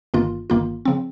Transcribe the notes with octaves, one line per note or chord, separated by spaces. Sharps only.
G1 G2 D#3 A#3 F4
G1 G2 D#3 A#3 F4
C#3 F3 C4